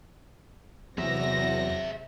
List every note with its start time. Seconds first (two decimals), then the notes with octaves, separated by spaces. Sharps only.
0.98 E2 C3 F#3 G#4 E5 A#6